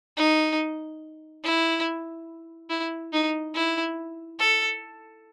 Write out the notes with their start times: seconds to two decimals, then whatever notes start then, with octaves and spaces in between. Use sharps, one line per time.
0.17 D#4
1.44 E4
2.70 E4
3.13 D#4
3.54 E4
4.39 A4